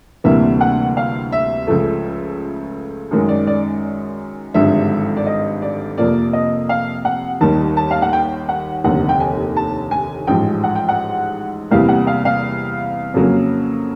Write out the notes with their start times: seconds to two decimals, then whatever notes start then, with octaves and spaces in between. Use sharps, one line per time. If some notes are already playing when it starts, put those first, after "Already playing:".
0.24 D2 C3 E3 G3 A#3 E5
0.61 F#5
0.97 F5
1.32 E5
1.67 C#2 C#3 F3 A3
3.11 F#2 D#3 G#3
3.28 D5
3.47 D5
4.54 G#1 G2 D3 F3 G#3 E5
5.17 D5
5.26 D#5
5.62 D5
5.98 F2 C3 F3 A#3 D5
6.33 D#5
6.69 F5
7.05 F#5
7.41 D#2 D#3 G3 A5
7.77 A5
7.91 F5
8.02 F#5
8.13 G5
8.49 F#5
8.84 F1 D#2 D3 F#5
9.09 G5
9.20 G#5
9.56 A5
9.91 G#5
10.27 A1 G#2 F3 G5
10.64 F#5
10.75 G5
10.89 F#5
11.70 E2 C3 E3 G3 A#3 F5
11.89 F#5
12.07 F5
12.25 F5
13.14 F2 C#3 F#3 A#3 C#4